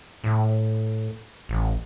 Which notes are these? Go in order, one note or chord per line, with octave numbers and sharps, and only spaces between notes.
A2
A1